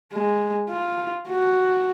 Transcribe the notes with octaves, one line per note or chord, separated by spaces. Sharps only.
G#3
F4
F#4